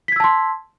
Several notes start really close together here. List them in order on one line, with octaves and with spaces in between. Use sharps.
B6 G#6 E6 A5 C6